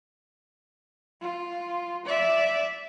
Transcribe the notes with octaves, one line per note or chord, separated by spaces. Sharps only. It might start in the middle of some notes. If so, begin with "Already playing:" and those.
F4
D5 E5